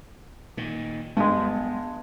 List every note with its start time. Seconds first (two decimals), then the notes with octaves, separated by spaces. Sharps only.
0.57 A#2 D#3
1.17 G2 G#3 B3